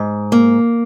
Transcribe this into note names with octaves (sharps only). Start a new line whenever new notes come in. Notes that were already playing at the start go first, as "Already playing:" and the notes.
Already playing: G#2
A#3